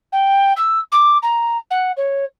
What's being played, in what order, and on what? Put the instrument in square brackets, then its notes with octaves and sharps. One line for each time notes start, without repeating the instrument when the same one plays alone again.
[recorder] G5
E6
D6
A#5
F#5
C#5